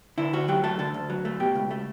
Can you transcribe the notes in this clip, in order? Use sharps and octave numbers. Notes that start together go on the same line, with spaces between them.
D3 E4
D2 F#4
F#3 G4
A3 A4
D3 A4
D2
F#3
A3
B2 G4
C#2
A3